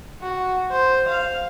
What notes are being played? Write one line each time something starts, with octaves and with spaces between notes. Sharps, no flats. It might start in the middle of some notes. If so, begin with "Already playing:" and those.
F#4
C5
F5